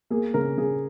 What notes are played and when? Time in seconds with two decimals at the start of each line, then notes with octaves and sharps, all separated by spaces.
0.10 A#3 G#4
0.34 C#3 A#4
0.58 C#3 G#4